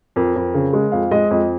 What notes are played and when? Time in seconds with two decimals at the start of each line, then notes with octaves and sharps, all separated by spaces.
0.16 F2 A#4
0.36 F2
0.54 C#3
0.73 G#3
0.92 F2 F5
1.11 G#3 D#5
1.30 F2 D#5